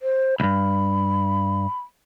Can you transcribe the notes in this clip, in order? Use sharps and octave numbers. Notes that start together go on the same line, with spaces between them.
C5
C#2 G2 B5